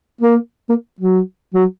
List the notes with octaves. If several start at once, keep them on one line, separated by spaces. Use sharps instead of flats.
A#3
A#3
F#3
F#3